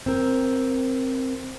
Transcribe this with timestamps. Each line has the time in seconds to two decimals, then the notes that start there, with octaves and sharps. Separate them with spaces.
0.06 C4 A#4